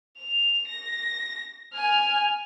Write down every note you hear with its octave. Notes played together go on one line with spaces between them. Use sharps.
F7
A#6
G#5 F6